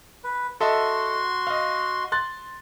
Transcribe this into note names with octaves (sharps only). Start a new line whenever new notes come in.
B4
F#4 A4 D#5 E5 C6
D#5 F5
C6 F#6 A6